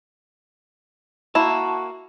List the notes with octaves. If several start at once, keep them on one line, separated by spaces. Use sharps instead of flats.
A#3 E4 F#4 A5